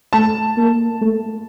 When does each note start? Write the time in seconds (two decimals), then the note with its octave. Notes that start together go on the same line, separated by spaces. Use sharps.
0.13 A3 A5
0.57 A#3
1.01 A3